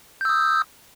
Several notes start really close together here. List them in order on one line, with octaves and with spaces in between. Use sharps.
G6 E6 D#6